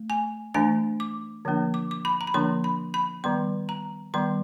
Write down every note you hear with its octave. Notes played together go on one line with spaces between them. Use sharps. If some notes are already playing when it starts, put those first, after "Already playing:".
Already playing: A3
G#5
E3 A3 D4 G#5
D6
D3 F3 A#3 D4
D6
D6
B5
A#5
B5
D3 F3 A#3 D4 C6
B5
B5
D#3 G3 B3 C6
A#5
D#3 G3 B3 C6